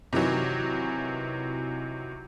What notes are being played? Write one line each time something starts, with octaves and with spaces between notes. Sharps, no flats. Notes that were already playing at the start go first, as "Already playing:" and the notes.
C3 D#3 E3 F#3